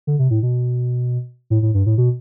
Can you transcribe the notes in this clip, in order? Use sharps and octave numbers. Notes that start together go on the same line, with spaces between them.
D3
C3
A2
B2
A2
A2
G2
A2
B2